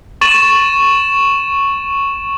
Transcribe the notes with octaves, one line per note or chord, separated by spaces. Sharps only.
C#6 A6 D#7 E7 F#7